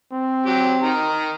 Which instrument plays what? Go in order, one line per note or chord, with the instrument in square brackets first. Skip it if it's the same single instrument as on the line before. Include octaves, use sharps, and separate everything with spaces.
[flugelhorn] C4
[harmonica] F#3 G4
D#3 A#5